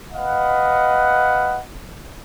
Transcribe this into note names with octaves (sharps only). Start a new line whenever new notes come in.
B4 D#5 F5 F#5